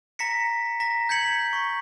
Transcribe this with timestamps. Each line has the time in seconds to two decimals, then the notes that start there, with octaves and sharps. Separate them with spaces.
0.19 A#5 A#6 B6 C#7
0.80 A#5 A#6 B6
1.09 G6 G#6 B6 C#7 F#7
1.53 C#6